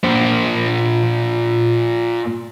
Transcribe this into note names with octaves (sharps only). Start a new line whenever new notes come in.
A#2 C5